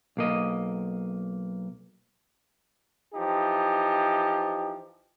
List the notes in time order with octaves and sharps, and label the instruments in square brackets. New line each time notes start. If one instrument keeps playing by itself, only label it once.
[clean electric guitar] B1 A#3 D#5
[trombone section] E3 F3 D#4 G4